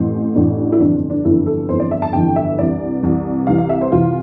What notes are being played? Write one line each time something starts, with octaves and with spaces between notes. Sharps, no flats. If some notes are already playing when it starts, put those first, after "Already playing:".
Already playing: A1 A2 E3 C4
A1 A2 E3 D4
E4
G1 F2 E3 D4
C4
D4
G1 F2 E3 E4
A4
G1 F2 E3 C5
D5
E5
A5
G1 F2 E3 G5
E5
C2 C3 E3 D5
C2 C3 E3
C2 C3 E3 F5
F5
E5
C5
C2 C3 E3 F4